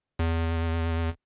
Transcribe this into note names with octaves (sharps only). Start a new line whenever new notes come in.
E2